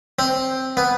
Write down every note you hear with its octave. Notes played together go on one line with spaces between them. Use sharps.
C4
B3